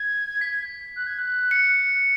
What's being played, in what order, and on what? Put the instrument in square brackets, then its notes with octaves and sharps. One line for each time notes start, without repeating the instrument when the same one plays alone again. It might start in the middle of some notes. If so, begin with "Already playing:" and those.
Already playing: [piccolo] G#6
[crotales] B6
[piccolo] F#6
G#6
F#6
[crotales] C#7